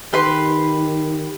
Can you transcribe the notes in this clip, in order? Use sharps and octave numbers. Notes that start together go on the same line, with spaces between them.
D#3 G4 B4 C6